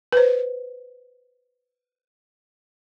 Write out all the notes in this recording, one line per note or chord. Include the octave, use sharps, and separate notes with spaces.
B4 C5